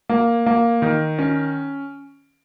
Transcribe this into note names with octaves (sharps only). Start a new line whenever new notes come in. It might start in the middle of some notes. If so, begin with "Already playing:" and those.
A#3
A#3
D#3
C#4